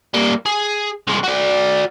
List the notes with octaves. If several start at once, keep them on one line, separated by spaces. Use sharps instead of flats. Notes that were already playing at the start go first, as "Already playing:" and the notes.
G3 A#3
G#4
C2 G#3
F#4 D5